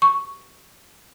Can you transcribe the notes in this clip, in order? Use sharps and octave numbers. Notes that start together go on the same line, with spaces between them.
C#6